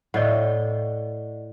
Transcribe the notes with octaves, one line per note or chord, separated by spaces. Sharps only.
A2 D5 D#5 F#5